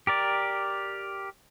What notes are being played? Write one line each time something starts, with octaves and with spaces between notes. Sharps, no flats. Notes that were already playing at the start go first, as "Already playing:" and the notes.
G4 A#4 D5